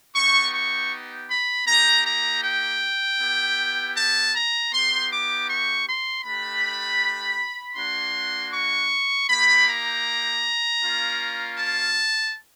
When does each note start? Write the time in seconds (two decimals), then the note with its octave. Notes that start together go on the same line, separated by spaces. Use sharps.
0.15 B3 D#4 G4 C#6
0.53 C#6
1.28 B5
1.67 A#3 D#4 G4 A#5
2.05 A#5
2.43 G5
3.19 B3 E4 G4
3.96 A5
4.34 A#5
4.72 B3 D#4 G4 C6
5.10 D6
5.48 C#6
5.86 C6
6.24 A3 D4 G4 B5
7.76 A#3 D4 F#4 C6
8.53 C#6
9.28 A#3 D#4 G4 B5
9.67 A#5
10.81 A#3 C#4 F4
11.57 A5